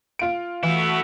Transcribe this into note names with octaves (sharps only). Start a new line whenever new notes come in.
F4 D7
E3 A3 B3 E4 F#4 E5